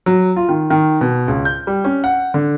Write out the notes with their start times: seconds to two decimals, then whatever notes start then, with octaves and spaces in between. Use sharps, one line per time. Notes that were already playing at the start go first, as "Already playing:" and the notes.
0.06 F#3
0.36 F4
0.49 D#3
0.70 D#3
1.01 B2
1.28 C#2
1.45 G6
1.67 G3
1.84 C#4
2.04 F#5
2.34 D3